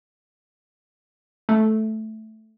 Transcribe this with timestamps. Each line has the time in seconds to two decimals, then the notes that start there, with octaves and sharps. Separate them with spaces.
1.49 A3